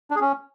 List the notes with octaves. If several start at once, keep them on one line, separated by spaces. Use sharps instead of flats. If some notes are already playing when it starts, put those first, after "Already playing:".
D4
G#4
C#4